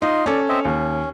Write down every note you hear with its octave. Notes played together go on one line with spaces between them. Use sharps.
D#4 F4 D#5 C6
C#4 A4 D5
C4 D#5 E5
D#2 C#4